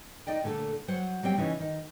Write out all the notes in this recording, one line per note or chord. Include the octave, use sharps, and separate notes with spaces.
D#4 D5 D#5 G5
A#2 D3 A3 A4
F#3 C5 F#5
F#3 G3 C4 G5
C#3 E3 C#4 D#4
D#3